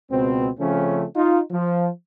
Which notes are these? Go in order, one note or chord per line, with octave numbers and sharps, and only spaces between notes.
C#2 B2 C4
C#3 F3 A3 C4 C#4
D#4 F4
F3